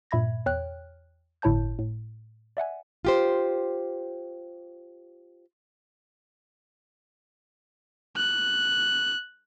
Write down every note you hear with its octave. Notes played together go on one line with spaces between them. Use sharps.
G2 A#2 E5 B5 G#6 A#6
E2 C#5 G5 F6 F#6
G1 A2 E4 C#5 A5 G6
A2
D5 E5 F#5 G#5
F4 G4 C5
F#6